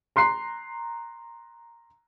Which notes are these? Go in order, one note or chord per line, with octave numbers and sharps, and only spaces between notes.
A#5 C6 F#6 C7